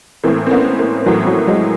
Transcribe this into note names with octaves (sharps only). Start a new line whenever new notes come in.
A2 E3 A#3 C4
C4
B3 C#4
A#3 C4
A2 E3 F#3
F#3
F#3 G#3